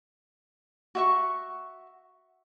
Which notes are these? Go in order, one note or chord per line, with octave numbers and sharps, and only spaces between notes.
F#4 E5 C#6